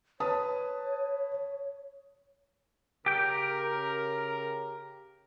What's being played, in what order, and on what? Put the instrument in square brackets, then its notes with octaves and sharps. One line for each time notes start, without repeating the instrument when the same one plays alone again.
[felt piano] B4 A5 D#6 [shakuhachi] C#5
[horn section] C#3 A#4 [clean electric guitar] G4 G5